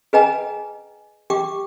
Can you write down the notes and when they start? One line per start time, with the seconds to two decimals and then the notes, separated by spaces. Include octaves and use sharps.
0.13 G#4 B4 D#5 G5 G#5 A#5
1.30 G4 G5 D6